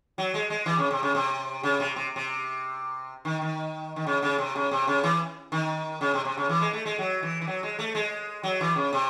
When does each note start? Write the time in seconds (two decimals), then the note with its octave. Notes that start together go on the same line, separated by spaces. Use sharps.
0.18 F#3
0.34 G#3
0.50 G#3
0.66 E3
0.78 C#3
0.91 C3
1.03 C#3
1.15 C3
1.63 C#3
1.80 C3
1.96 C3
2.16 C3
3.25 D#3
3.42 D#3
3.96 D#3
4.07 C#3
4.23 C#3
4.38 C3
4.56 C#3
4.71 C3
4.88 C#3
5.03 E3
5.52 D#3
6.01 C#3
6.14 C3
6.25 C3
6.38 C#3
6.49 E3
6.61 G#3
6.73 A3
6.86 G#3
6.99 F#3
7.23 E3
7.41 E3
7.47 F#3
7.63 G#3
7.79 A3
7.95 G#3
8.43 F#3
8.61 E3
8.76 C#3
8.93 C3